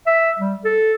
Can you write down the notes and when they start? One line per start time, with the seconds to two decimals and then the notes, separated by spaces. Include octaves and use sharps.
0.07 E5
0.39 G3
0.65 A4